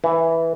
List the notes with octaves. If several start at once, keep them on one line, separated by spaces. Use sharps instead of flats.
E3